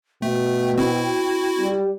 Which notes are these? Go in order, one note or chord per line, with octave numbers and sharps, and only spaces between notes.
B2 A3 G5
C4 E4 F#4
G3